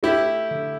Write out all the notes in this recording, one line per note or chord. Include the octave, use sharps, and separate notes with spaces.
A3 E4 G4
D3